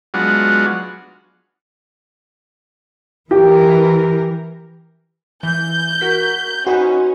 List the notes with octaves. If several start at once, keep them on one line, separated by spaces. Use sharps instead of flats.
F#3 G#3 B3 D4 F4 F#4
E3 G4 A#4
E3 G6
F#4 A#4 B6
C#4 D#4 F#4 B4 C5